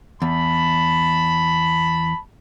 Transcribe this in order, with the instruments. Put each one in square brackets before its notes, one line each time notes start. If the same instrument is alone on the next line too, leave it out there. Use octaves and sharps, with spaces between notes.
[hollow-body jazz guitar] E2 [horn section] A5 B5